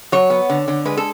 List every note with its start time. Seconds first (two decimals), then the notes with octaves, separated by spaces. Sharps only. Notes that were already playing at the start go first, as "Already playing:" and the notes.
0.12 F#3 C#5
0.30 B3
0.49 D3
0.68 D3
0.85 G#3 B4
0.97 A4